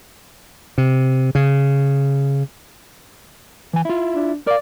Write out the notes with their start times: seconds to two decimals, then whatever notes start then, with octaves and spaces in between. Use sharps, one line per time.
0.78 C3
1.35 C#3
3.73 E3 G#5
3.85 E4 F4
4.15 D4
4.47 A#4 D5 F5